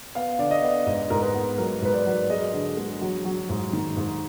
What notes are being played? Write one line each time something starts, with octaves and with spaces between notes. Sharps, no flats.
B3 F5
D3 D5
D#5
B3
G#2 D#5
G#2 A#4
B4
B3
F#3 A#4
G#2 B4
D5
F#3
G#3 D#5
D3
G#3
F#3
F#3
G#2
D#3
G#2